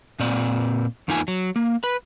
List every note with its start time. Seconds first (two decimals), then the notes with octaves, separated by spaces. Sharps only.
0.20 A#2 C4 D5
1.08 E2 A#3 D#4 F4 G#5
1.28 F#3
1.56 A#3
1.84 B4